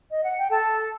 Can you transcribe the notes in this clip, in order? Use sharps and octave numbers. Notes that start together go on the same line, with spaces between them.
D#5
F#5
G5
A4 A5